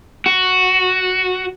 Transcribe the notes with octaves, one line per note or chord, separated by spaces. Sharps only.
F#4